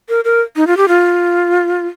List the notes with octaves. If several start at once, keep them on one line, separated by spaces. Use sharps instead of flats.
A#4
A#4
D#4
F4
G4
F4